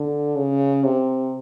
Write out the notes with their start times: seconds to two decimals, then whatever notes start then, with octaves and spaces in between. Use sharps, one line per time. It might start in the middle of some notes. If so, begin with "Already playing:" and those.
Already playing: D3
0.36 C#3
0.84 C3